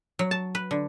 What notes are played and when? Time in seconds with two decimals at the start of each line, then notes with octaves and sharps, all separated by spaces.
0.19 F#3
0.31 A5
0.55 B4
0.71 D3